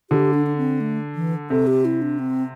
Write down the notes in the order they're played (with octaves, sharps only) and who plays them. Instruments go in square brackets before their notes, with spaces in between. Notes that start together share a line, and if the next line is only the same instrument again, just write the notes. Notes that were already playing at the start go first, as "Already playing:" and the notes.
[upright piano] D3 [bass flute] G4
[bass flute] D4
D4
C4
A3
E3
[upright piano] C3 [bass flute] A4
[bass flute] G4
E4
D4
C4